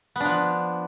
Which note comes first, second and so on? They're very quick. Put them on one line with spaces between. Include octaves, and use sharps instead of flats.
B3 D4 F3